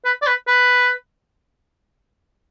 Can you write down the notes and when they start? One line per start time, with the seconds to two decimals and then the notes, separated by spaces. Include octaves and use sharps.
0.05 B4
0.22 D5
0.27 B4
0.47 B4